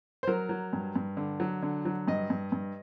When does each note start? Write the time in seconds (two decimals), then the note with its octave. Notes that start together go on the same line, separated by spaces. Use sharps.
0.23 C5
0.27 F#3 A#4
0.49 F#3
0.73 G2
0.96 G2
1.17 D3
1.40 F#3
1.62 D3
1.85 F#3
2.08 G2 D#5
2.30 G2
2.52 G2